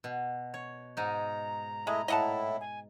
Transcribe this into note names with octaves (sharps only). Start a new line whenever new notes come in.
B2
C#5
G#2 D#4 A#5
G#3 A3 E4 D#5
A2 E4 D#5 F#5 A5
G#5